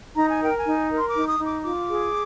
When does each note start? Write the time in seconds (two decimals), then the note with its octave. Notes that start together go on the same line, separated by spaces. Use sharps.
0.15 D#4 A#5
0.30 G#5
0.41 A#4 G5
0.57 G#5
0.65 D#4
0.90 A#4
0.98 C6
1.08 D6
1.15 D#4
1.27 D#6
1.38 D#4
1.45 D6
1.63 F4 D6
1.88 G#4